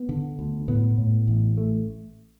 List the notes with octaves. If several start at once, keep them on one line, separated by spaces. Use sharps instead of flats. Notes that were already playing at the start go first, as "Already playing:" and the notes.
Already playing: B3
D3
D2
A2 B3
A2
A1
A3